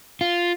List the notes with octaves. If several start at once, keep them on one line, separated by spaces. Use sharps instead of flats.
F4